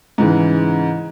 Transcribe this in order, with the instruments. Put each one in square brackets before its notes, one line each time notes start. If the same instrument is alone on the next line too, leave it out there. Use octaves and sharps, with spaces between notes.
[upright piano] G#2 C#3 E3 G#3